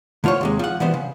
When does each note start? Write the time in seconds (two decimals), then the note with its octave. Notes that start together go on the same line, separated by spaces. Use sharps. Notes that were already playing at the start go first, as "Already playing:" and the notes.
0.24 D3 A3 F4 C5 C#5
0.41 D#2 C3 G#3
0.59 F3 F#5
0.80 E3 G3 B3 C5
0.94 C#3